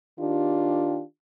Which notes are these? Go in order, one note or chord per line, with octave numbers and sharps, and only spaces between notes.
D#3 D4 F4 G4